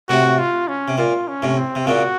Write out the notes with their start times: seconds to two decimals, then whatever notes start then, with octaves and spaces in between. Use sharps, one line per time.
0.09 A2 C3 F#4
0.39 F4
0.68 C#4
0.88 C3
0.98 A#2 F4
1.28 C#4
1.42 A2 C3
1.57 C4
1.75 C3
1.87 A#2 C#3 F#4